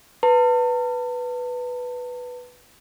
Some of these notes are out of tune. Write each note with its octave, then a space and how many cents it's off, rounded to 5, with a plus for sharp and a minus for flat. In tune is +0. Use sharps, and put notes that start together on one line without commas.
B4 +0 A5 +40